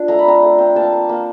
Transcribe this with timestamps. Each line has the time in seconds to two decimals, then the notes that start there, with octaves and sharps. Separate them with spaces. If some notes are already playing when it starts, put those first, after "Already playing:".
Already playing: D4 F4
0.08 A3 A#5
0.19 B5
0.25 C4 A#5
0.42 A3
0.59 C4
0.76 A#3 A5
0.93 A#3
1.09 A#3